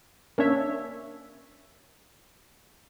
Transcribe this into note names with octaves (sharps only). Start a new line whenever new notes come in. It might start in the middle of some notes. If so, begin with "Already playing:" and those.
A#3 C#4 D4 C#5 E5